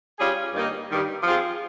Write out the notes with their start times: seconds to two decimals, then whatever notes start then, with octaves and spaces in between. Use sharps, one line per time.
0.19 G3 C#4 F4 G#4
0.54 G2 D#3 A#3 D#4
0.89 G2 D#3 G3
1.23 F3 C4 F4 G#4